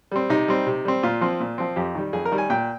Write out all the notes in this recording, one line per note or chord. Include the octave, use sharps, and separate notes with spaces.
G3 C4
C3 D#4
G3 C4
C3
G3 C4
A#2 F4
F3 C4
A#2
F3 C4
F2 G4
D#3 G3
F2 G#4
A#4
D#3 G3
G#5
A#2 G5